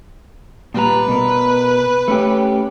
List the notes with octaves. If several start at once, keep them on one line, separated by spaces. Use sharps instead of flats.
A#2 G3 B4 A#5
B2 A#4
A3 C#4 G4